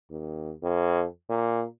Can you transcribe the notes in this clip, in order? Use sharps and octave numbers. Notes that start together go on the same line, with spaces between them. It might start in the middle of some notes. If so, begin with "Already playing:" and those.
D#2
F2
A#2